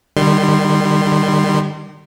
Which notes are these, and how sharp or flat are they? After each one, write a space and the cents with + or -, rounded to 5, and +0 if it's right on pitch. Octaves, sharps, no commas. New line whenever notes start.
D#3 -40 G3 +0 C6 +0